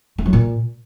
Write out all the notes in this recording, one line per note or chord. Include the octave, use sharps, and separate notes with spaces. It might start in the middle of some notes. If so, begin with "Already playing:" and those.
A3
F#3
A#2